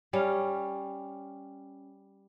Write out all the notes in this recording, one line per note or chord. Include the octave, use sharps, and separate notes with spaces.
G3 C#4 C#5 F5